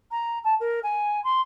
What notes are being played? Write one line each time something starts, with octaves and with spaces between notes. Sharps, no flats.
A#5
A5
A#4
G#5
C6